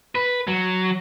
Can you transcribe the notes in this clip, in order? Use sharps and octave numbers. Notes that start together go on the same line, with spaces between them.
B4
F#3